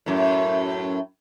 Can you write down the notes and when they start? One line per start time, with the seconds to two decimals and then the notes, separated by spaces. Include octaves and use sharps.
0.06 F#2 A2